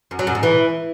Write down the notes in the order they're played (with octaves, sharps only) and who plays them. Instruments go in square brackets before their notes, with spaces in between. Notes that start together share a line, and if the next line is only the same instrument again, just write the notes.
[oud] F#2
F#3
F#2
G#2
E3